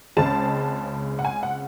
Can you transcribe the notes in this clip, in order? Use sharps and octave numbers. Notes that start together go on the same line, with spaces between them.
C#2 C#3 G#3 C4 A5
F#5
G#5
F#5